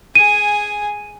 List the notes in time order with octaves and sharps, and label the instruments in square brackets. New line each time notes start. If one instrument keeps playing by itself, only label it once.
[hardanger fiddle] G#4 G#5 [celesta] D#7